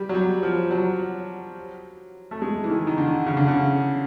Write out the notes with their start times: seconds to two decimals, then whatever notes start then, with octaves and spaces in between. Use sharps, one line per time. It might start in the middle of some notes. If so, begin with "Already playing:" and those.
Already playing: G3
0.09 F#3
0.15 G3
0.43 F3
0.71 F#3
2.31 A3
2.42 G#3
2.64 E3
2.69 D#3
2.87 D#3
2.98 D3
3.26 C#3
3.37 D3
3.48 C#3